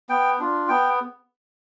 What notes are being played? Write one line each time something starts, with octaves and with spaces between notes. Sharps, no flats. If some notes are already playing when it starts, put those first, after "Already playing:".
B3 G5
D4 F4
B3 G5